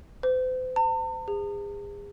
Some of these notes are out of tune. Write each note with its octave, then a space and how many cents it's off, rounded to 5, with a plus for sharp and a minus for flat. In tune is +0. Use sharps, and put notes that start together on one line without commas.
C5 -40
A5 +45
G#4 -35